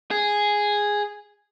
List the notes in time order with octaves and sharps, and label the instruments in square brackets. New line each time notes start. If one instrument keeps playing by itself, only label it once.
[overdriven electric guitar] G#4